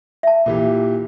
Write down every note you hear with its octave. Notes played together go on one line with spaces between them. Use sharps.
E5 A5
A#2 E3 G4